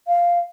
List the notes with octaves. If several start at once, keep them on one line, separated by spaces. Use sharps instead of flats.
F5